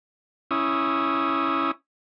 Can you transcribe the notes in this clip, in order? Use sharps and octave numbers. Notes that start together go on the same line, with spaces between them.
C#4 E4 D#6